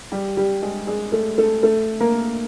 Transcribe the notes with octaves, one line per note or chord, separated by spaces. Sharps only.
G3 G4
G3 G4
G#3 G#4
G#3 G#4
A3 A4
A3 A4
A3 A4
A#3 A#4